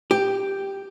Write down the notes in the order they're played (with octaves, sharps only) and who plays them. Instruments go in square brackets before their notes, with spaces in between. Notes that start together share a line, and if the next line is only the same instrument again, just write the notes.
[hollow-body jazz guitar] G4